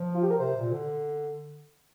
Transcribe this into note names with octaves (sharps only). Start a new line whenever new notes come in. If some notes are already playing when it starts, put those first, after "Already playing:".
Already playing: F3
F4
G4
A#4
C3 C5
A#2
D3